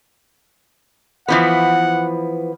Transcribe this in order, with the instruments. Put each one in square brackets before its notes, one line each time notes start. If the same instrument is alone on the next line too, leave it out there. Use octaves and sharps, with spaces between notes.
[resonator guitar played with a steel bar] E3 F3 B3 [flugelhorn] F#5